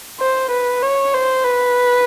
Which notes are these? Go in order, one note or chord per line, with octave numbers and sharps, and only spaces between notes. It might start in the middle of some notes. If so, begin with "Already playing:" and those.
C5
B4
C#5
C5
B4